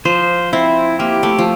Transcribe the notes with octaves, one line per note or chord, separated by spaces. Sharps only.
F3 C5
C4 E4
A#3 G4
A3
F3